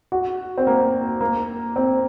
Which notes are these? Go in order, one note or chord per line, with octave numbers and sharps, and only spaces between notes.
F#4
C4
A#3
A#3
C4